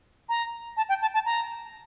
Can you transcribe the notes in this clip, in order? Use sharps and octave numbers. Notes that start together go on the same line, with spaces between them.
A#5
A5
G5
A5
A5
A#5